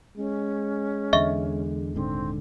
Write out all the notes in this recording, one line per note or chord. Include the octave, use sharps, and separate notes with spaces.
G#3 C#4
E2 D3 D#5 E5 C#6
D#1 G#2 D3 C4